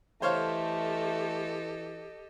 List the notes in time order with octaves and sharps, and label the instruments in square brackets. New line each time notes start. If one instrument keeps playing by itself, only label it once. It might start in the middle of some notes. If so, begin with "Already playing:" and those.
[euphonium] E3 [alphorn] A3 [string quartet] G4 A4 D#5 [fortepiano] C5 C#5 F5